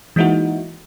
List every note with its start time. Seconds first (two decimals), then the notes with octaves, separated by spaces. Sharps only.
0.16 E3 G#3 A#3 D#4 E4 F#4